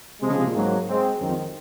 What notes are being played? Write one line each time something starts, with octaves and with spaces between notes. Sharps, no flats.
C3 F3 G#3
C#3
C3
A#2
G#2 F#3 A#3
G#3 C4
F#2 D#3
F2